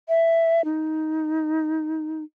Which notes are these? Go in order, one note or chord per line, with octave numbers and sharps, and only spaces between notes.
E5
D#4